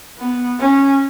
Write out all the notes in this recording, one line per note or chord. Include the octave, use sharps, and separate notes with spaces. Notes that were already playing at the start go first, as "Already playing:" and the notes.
B3
C#4